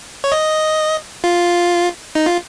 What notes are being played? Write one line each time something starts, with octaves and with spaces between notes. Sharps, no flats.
C#5
D#5
F4
D#4
F4